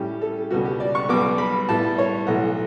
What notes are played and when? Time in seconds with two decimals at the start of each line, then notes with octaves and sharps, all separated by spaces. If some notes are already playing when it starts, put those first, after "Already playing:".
Already playing: A2 G3 C#4 G4
0.21 A4
0.51 C#2 B2 G3 B3 F#4
0.65 G4
0.80 D5
0.95 C#6
1.09 B1 B2 G3 B3 D6
1.38 B5
1.69 A2 G3 B3 A5
1.98 C#5
2.27 B1 A2 E3 A3 F#5